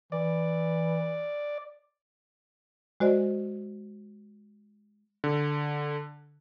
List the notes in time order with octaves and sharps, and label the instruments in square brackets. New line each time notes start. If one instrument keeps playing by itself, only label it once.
[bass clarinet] E3 [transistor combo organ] D5
[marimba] G#3 F#4 C5 D5 D#5
[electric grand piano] D3